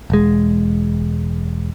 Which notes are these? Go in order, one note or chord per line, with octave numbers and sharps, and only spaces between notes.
E1 G#3